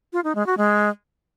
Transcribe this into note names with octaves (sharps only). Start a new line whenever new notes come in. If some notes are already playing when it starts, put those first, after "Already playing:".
F4
D#4
G#3
F#4
G#3